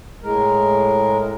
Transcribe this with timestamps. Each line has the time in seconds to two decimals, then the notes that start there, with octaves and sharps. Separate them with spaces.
0.23 A2 G#3 A#4